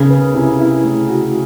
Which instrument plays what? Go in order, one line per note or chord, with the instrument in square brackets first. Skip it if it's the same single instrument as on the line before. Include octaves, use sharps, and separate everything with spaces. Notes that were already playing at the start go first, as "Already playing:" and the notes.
Already playing: [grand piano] C#3 [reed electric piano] B3 D#4 A#4
[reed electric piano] B4
[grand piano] C3 [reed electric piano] E4
[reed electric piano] E4
A3
F#4